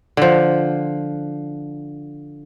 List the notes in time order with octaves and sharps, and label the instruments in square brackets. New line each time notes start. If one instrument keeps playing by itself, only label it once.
[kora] D3 F3